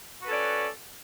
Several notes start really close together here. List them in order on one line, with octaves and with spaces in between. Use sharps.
F#4 B4 A4 C#4 D5